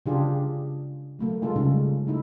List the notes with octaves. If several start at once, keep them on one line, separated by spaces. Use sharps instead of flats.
C#3 D4 F4 G4 G#4
F#3 A3 A#3
G#3 F4 A4
C#3 G3 C#4 D#4
A3 D#4 E4